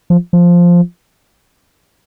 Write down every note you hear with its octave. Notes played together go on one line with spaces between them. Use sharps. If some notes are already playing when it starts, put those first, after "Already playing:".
F3
F3